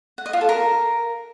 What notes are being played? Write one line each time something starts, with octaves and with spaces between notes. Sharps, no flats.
F#5
D#5
F4
A4
A#4